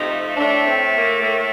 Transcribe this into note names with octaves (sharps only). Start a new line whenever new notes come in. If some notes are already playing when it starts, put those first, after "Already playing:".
Already playing: C3 F3 A3 D#4
A2 A3 D4
C4
A#3
A#3